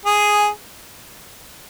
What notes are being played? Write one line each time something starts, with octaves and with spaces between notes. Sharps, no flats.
G#4